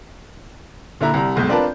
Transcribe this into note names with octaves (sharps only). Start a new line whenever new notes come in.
A#2 D3 E4 A#5
C2 G3 A#5
F1 B1 G#3 G6
C4 D4 F4 A#4 B4 A5